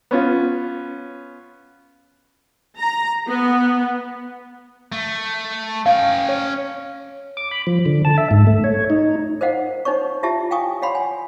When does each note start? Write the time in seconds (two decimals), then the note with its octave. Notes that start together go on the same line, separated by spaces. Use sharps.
0.11 B3 C#4 F4
2.77 A#5
3.27 B3
4.92 A3
5.86 C#4 F5 G5
6.29 C#5
7.37 D6
7.51 B5
7.67 F3
7.86 D3
8.05 A5
8.18 E5
8.31 G#2
8.47 A3
8.64 C#5
8.90 D#4
9.41 A#4 C5 D#5 F5 F#5
9.85 D4 D#4 C5 C#5 C#6
10.23 E4 F4 G4 E5 A5
10.51 F5 G5 G#5 C#6 D#6
10.82 C#5 F5 F#5 B5 C6
10.95 G#5